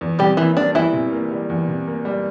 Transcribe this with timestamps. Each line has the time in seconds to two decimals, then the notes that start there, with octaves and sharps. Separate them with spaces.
0.01 E2
0.19 C3 G3 G4
0.37 E3 A#3 E4
0.56 G3 D4
0.75 E2 E3 E4
0.93 C3
1.12 A#3
1.31 G3
1.50 E2
1.68 C3
1.88 A#3
2.05 G3